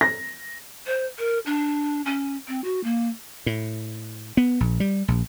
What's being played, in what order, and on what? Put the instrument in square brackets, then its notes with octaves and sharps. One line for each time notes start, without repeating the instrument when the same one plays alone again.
[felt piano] A#6
[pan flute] C5
A#4
D4
C#4
C4
F#4
A#3
[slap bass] A2
B3
A#1
G3
A#1